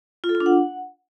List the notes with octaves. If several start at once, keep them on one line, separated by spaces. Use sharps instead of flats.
F4
A4
F4
D4
F#5